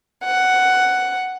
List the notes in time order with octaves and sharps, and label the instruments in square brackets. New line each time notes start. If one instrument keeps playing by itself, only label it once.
[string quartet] F#5